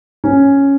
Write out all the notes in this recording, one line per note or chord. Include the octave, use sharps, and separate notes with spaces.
C#4